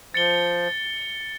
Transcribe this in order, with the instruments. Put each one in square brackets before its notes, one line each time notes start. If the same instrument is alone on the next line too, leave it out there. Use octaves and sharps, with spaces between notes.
[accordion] F3 [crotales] A6 C#7 G7